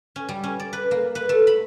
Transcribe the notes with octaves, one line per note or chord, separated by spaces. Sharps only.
C#4
G3
C#4
D5
B4
A#3
B4
A3
B5